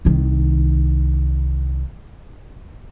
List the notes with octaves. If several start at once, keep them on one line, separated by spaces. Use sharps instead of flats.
C2 D#3